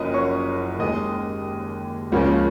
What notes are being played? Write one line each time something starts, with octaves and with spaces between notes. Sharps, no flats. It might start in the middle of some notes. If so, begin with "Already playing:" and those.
Already playing: F#1 F#2 F3 A#3 C#4 D#5 D#6
C#5 C#6
D#2 D#3 G#3 D#5 D#6
C#2 C#3 F3 A#3 C#4